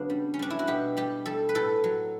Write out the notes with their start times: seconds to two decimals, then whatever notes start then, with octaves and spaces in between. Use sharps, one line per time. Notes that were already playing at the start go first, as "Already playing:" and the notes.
Already playing: C#3 F#3 B3 D4
0.10 G3
0.34 C#4
0.39 G3 D4
0.50 E4
0.59 F#4
0.67 B2 G4
0.97 G3 G4
1.26 G3 A4
1.49 B4
1.55 A2 A4
1.84 F#3